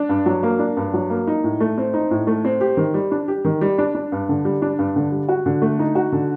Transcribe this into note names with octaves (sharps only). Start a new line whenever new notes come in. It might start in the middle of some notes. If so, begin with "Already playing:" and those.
Already playing: D4
G2
F#3
A#3
D4
G2
F#3
A#3
D#4
A2
A3
C4
D#4
A2
A3
C4
G4
D#3
G3
D4
G4
D#3
G3
D4
D4
G2
D3
G3
D4
G2
D3
G3
F#4
D3
A3
D#4
F#4
D3